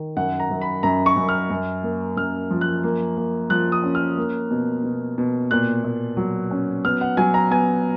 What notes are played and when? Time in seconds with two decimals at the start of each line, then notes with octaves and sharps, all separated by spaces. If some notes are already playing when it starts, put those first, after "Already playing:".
Already playing: D#3
0.16 F#2 F#5
0.40 A#5
0.50 F#2
0.61 B5
0.83 F#2 A#5
1.06 C#6
1.17 F#2
1.29 F6
1.50 F#2
1.83 A#3
2.16 F#2 F6
2.50 F3
2.61 F#6
2.83 A#3
3.17 A#3
3.50 F3 F#6
3.72 D#6
3.83 C#4
3.95 F6
4.18 A#3
4.51 B2
4.84 B2
5.18 B2
5.51 A#2 F#6
5.84 A#2
6.17 F#3
6.51 C#4
6.85 B3 F6
7.01 F#5
7.17 F#3 G#5
7.34 A#5
7.51 B3 G#5